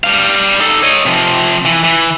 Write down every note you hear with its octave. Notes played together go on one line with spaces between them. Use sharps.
G3 F5
D#4 A4
C#5 D#5
C3 F3
E3
E3